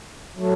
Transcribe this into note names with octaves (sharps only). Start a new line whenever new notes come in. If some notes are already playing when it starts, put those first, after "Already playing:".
F#3 A3